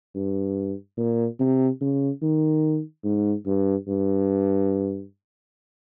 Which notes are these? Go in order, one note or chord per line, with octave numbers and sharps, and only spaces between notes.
G2
A#2
C3
C#3
D#3
G#2
G2
G2